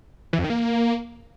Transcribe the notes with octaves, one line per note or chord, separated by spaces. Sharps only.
E3
F2
D#3
A#3